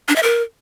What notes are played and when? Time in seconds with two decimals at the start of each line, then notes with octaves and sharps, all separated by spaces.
0.09 D4
0.16 E5
0.23 A#4